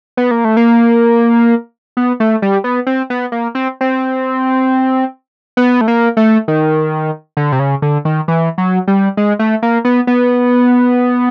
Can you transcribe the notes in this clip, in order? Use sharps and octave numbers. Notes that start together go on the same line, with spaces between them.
B3
A#3
A3
A#3
B3
A3
G3
B3
C4
B3
A#3
C4
C4
B3
A3
A#3
A3
D#3
D3
C3
C#3
D3
D#3
E3
F#3
G3
G#3
A3
A#3
B3
B3